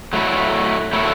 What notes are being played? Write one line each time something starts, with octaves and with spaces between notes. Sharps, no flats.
F#3 A3 E4
F#3 A3 E4